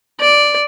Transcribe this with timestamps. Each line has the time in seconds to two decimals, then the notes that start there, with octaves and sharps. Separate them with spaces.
0.21 D5